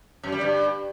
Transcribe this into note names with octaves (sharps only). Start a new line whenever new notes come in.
F#2
G3
G2